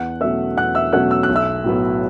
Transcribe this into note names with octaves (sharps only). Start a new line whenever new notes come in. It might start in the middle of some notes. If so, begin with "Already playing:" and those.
Already playing: E2 F#5 F#6
B2 F#3 A3 C#4 E5 E6
E2 F#5 F#6
E5 E6
B2 F#3 A3 C#4 F#5 F#6
E6
F#6
B1
E5 E6
A2 F#3 B3